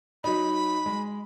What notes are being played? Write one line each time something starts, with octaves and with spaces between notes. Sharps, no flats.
F#3 D#4 B5
G#3